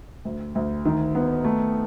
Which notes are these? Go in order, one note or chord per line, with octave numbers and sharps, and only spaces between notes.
D2
D2
D#3
B3
A3